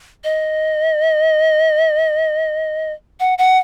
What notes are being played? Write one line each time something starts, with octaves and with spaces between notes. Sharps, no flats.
D#5
F#5
F#5